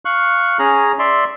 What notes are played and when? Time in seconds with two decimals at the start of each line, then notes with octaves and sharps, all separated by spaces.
0.05 F5 C#6 F#6
0.59 C#4 G#4 A#5
0.99 D5 E5 C6